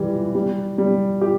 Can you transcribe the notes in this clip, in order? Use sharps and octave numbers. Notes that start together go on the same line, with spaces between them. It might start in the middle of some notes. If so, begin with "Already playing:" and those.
Already playing: E3 G3
G3
G3
G4